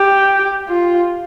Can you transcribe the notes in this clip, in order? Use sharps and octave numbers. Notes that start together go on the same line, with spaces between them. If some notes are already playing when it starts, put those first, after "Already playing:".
Already playing: G4
F4